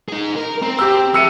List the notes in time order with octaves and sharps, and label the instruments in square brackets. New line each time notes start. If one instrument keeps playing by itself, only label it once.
[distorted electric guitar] D#4 G#4
A#4
[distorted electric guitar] C4 [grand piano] A#5
[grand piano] G4 E6
[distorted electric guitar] G#4 E5 [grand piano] E6 C#7 D#7